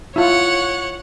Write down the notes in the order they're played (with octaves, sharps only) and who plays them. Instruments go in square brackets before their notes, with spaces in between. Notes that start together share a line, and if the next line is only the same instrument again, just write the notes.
[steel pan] E4 F4 [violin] C#5 F#5